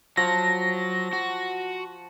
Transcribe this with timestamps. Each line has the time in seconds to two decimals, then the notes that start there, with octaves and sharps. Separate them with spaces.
0.17 F3 F#3 A#6
1.13 F#4